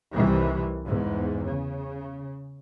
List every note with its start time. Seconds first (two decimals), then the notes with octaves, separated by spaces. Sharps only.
0.14 C2 C3 D#3 E3 G3
0.87 E2 G#2
1.45 C#3